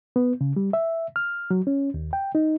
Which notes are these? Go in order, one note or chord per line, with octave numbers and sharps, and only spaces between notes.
B3
C#3
G3
E5
F6
F#3
C#4
D#2
G5
D#4